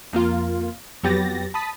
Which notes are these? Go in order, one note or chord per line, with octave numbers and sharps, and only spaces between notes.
F2 A#3 F4
F2 F#3 B3 G4 A6 A#6
A5 B5 D#6 B6